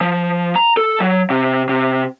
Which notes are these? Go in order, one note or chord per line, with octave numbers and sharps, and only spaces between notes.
F3
A#5
A4
F#3
C3
C3